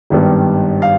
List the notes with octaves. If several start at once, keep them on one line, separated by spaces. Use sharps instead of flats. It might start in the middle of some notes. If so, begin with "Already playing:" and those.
G#1 G2 D#3 G3 B3
F5